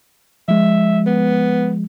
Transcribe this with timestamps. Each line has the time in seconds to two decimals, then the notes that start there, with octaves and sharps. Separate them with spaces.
0.48 F3 G#3 E5
1.06 B3